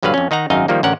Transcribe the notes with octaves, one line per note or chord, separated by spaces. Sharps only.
A#1 G2 D3 F#3 B4 F5
F2 C#4
D#3 D#4 F#5 A#5
G#1 F#2 D#4 D#5 F5
D#3 F3 G3 A#3 D#4
A1 D3 C#4 A#4 F#5